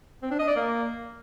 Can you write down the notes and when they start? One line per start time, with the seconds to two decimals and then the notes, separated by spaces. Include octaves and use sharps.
0.22 C4
0.31 D4
0.39 D#5
0.48 D5
0.56 A#3